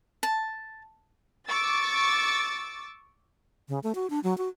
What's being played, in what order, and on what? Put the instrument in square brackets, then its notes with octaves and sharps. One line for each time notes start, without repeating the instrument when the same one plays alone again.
[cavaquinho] A5
[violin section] C#6 D6 E6 A6
[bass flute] C#3
A3
F#4
D4
F#3
F#4